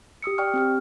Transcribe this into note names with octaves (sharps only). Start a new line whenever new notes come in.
G4 D#6 E6 C#7
D5 G5 C#6 F6
C4 G4 F6